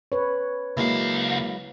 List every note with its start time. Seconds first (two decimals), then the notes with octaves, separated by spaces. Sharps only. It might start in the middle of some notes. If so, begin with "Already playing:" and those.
0.12 B4 C#5
0.77 C#2 F#3 G#3 A#3 E4 F5